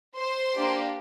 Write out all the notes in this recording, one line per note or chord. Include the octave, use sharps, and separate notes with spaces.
C5 C6
A#3 D4 G4